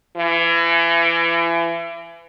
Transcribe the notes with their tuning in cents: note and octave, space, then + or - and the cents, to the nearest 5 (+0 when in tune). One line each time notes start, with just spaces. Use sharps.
E3 +30